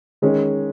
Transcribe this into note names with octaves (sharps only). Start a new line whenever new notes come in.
D#3 G#3 C#4